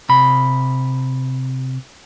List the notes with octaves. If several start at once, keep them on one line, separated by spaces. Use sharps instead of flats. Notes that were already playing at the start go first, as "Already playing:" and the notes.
C3 B5